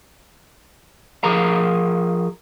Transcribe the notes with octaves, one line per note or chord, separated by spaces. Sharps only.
F3 G#4 A#4 A#5